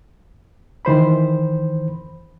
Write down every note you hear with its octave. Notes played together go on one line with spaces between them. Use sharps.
D#3 E3 C5 B5